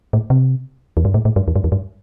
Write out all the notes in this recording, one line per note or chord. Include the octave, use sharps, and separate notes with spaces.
A2
C3
E2
G2
A2
A2
G2
E2
G2
E2
G2